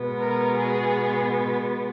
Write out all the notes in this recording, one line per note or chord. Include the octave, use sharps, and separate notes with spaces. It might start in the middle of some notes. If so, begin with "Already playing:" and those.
Already playing: B2 G#3 B3
A#4
G#4